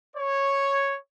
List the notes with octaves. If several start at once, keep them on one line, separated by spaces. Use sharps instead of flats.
C#5